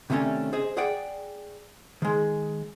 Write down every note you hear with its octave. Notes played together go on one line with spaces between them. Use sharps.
C3 D#3 G3 A3 C#4 D4
G#4 C5 D#5
G#4 D5 F#5 G5
D#3 G#3